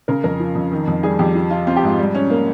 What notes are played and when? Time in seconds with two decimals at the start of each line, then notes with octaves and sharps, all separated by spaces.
0.08 C#3 A#4
0.24 F2 A#4
0.40 F3
0.55 F2
0.72 D#3
0.87 F2
1.03 G3 G#4
1.19 F2 G4
1.35 F3
1.51 F4
1.67 C4 F4
1.76 G4
1.83 G#2 F4
1.98 G3
2.15 C#4
2.30 A#3